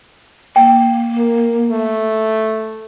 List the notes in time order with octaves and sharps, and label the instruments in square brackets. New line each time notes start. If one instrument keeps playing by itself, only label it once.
[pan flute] A#3 [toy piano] G5
[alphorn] A#4
A3